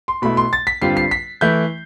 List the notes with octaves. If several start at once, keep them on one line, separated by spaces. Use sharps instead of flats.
C6
B2 A3 E4 B5
C6
A6
B6
G2 D3 G3 C4 F4 C7
C7
B6
E3 A3 E4 G6